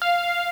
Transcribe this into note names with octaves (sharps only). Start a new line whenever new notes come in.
F5